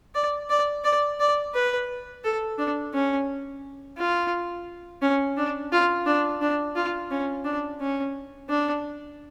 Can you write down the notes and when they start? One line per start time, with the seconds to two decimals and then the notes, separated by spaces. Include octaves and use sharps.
0.15 D5
0.50 D5
0.84 D5
1.20 D5
1.54 B4
2.24 A4
2.58 D4
2.94 C#4
3.97 F4
5.02 C#4
5.37 D4
5.72 F4
6.06 D4
6.41 D4
6.76 F4
7.11 C#4
7.45 D4
7.81 C#4
8.49 D4